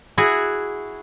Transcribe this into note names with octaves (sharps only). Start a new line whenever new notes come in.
E4 F#4 G#4